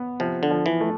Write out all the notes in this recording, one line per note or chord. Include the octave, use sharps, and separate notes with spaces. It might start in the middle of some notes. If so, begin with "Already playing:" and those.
Already playing: B3
C3 F3
D3
F3
E3
A3